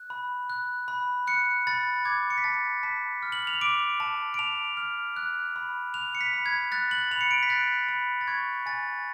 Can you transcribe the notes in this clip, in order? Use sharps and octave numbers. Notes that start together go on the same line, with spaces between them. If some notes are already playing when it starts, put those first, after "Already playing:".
Already playing: F#6
B5
F#6
B5
F#6 C#7
B5 A6
D6 G#6
C#7
B6
A5 A6
A5 B6
F6
F#7
F7
D6 D7
A5
D7
A5 F7
F6
F#6
B5
F#6 F7
C#7
B6
B5
G#6
F#6 A6
F#7
B5 F7
C#7
D7
B6
F#6 A6
B5
A6
C#6 G#6
G#5 A6